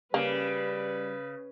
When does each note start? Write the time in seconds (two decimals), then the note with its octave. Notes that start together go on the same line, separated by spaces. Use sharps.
0.14 C#3 G3 A#3 B4